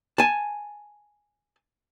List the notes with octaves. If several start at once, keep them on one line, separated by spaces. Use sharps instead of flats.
G#5 A5